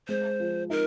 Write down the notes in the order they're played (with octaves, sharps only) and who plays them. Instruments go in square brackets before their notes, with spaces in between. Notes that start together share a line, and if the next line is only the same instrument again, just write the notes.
[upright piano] G#3 [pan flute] C5
[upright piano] F3
[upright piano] D#4 [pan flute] A#4